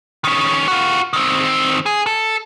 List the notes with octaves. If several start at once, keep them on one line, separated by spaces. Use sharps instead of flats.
D#3 C#4
F4 F#4
D#3 C4
G#4
A4